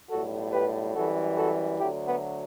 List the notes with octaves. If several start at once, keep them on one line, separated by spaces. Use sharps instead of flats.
B1 A2 G3 F#4 A4
G4 B4
F#2 E3 G3 F#4 A4
F#4 A4
D2 D3 F#3 E4 G4
B3